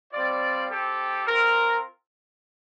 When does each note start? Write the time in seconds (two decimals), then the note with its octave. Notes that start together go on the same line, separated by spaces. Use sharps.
0.13 G3 C4 F4 D5
0.70 C4 G4 A4
1.26 C4 F4 A#4